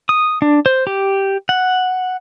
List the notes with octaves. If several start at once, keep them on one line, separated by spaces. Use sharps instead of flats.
D#6
D4
C5
G4
F#5